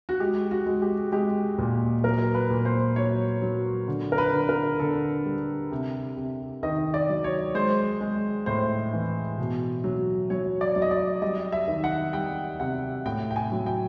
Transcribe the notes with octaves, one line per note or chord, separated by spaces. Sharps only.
F#4
G#3 G4
F#4
G#3
G4
G#3 G4
A#2
F#3 A#4
B4
A#2
C5
F#3 C#5
F#3
D3
A#4
B4
D3
A#4
D3 A4
G3
C3
C3
D#3 D#5
D5
F#3
C#5
G#3 C5
G#3
A2 C5
E3
B2
F#3
F#3 C#5
D5
F#3
D#5
D5
G3 D#5
E5
D#3
F#5
G3 G5
C3 F#5
A2 G5
G5
G#5
F#3
G5